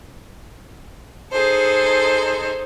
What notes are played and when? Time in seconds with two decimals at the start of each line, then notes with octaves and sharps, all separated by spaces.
1.32 D#4 G#4 A4 C5